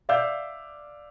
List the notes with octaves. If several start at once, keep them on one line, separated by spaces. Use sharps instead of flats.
D5 E5 F5 D6 E6 G6